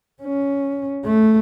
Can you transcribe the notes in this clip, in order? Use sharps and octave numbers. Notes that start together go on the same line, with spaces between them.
C#4
A3